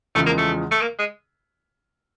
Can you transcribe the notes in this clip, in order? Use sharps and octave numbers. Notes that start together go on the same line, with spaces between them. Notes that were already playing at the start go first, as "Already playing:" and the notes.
E2 C#3 F3 G#3 A3
A#3
A3
A3
A#3
G#3